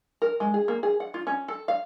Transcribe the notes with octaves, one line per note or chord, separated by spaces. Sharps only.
A#4
G#3
G#4
A#3
G#4
F#5
F4
C#4
A4
F5